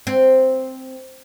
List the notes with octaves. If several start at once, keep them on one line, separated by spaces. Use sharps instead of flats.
C4